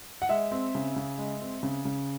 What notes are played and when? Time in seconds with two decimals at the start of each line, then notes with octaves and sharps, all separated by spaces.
0.22 F#5
0.29 G#3 E5
0.51 C4
0.75 C#3
0.96 C#3
1.18 G#3
1.41 C4
1.63 C#3
1.85 C#3